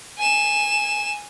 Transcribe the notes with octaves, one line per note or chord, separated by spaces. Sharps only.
G#5 E7